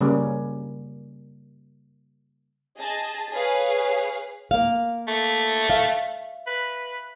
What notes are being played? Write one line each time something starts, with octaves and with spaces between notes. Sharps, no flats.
C#3 G3 A#3 C#4
G#4 D#5 A5
G#4 B4 C#5 F5 C7
A#3 F5
A3
E5 F5
B4